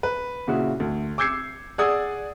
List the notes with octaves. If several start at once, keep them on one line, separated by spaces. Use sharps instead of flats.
B4
A#2 C#3 E4 F#4
D2
D6 E6 G6 G#6 C7 C#7
G#4 D5 F#5 D#6 E6 G#6